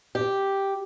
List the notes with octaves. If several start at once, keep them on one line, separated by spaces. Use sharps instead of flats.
G4